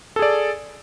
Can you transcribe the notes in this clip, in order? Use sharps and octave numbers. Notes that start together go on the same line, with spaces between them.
G#4 A4 D5